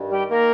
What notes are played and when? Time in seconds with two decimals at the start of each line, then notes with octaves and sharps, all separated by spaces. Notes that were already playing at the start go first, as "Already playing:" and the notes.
Already playing: G2 D#3
0.10 G3 G4
0.29 D#3 A#3 A#4